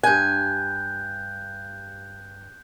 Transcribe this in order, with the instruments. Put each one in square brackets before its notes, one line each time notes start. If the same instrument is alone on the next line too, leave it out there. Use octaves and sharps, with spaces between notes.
[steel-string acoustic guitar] G2 G#5 [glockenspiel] F#6 G6